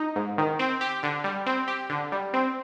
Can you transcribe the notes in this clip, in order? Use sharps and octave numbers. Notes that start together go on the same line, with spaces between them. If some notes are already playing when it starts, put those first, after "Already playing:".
Already playing: D#4
G#2
D#3
C4
G4
D3
G3
C4
G4
D3
G3
C4